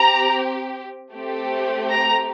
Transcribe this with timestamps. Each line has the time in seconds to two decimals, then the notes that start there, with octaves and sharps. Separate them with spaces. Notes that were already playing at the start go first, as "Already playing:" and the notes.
Already playing: C4 G4 A#5
1.13 A3 C4 G4
1.90 A#5